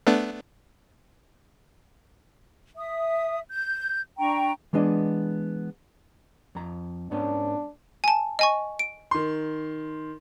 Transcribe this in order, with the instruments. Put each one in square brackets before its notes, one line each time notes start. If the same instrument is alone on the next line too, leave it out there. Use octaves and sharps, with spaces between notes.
[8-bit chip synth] A3 B3 D4
[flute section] E5 D#6
G6
D4 G5 A#5 C#6
[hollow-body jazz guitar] E3 G#3 B3 D4 D#5
F2 A#5
[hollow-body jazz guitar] G#2 B3 C#4 [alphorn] D4
[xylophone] G#5 A5
D#5 G#5 C#6
D7
[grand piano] D#3 C6